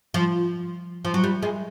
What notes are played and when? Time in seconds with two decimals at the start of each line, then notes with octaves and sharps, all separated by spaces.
0.14 F3
1.05 F3
1.14 F#3
1.24 G3
1.43 G#3